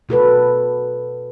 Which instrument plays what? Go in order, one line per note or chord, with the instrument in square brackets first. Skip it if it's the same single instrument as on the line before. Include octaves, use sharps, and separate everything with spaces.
[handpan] B2 F#4 A4 B4